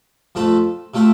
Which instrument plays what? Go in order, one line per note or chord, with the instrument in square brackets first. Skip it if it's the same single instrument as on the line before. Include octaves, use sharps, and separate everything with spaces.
[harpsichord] F2 F3 A3 F4 A4
C3 A3 F4 A4